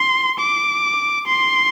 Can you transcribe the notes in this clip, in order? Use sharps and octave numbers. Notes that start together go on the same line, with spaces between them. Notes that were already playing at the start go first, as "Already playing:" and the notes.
Already playing: C6
D6
C6